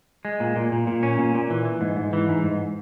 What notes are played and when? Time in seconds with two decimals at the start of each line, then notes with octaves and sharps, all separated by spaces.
0.25 G#3
0.40 A#2
0.56 A#2
0.72 A#2
0.87 A#2
1.03 C#4
1.19 A#2
1.35 A#2
1.50 E3
1.65 E3
1.81 G#2
1.96 G#2
2.13 E3
2.29 G#2
2.44 G#2